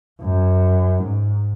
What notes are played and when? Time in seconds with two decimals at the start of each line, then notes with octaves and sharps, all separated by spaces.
0.21 F#2
1.04 G#2